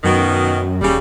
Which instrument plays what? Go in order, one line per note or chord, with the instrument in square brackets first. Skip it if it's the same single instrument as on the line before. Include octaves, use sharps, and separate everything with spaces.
[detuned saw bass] F#2 [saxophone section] B2 D#3
[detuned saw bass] D#1 [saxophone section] C#3 G3